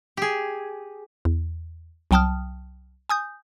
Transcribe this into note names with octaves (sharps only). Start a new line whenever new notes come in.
G4 G#4
E2
C2 F#3 G5 A5 D#6 F6
G#5 D#6 G6